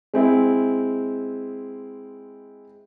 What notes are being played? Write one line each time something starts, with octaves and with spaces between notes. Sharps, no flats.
G#3 C4 E4